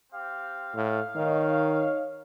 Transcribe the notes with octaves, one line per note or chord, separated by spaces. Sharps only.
C4 G4 F5
A2 F5
D#3 D#4 C#5